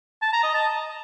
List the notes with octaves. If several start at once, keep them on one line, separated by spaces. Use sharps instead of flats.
A5
A#5
D#5
A5